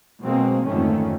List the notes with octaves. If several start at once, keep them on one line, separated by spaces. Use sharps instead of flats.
B2 F#3 G#3 A#3 C4
F2 G#2 D3 D#3 A3 C#4